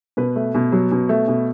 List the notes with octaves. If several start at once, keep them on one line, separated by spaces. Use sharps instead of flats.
B2 B4
A3
B2
F#3
B2
A3
B2